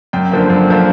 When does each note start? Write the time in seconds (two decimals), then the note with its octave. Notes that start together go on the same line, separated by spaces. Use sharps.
0.13 F#2 G5
0.31 D3 F3 A#3
0.50 F#2
0.68 D3 F3 A#3